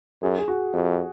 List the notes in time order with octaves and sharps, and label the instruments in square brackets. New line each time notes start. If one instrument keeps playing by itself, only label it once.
[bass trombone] F#2 [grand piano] G#4
[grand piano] G#4
F#4
[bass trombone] F2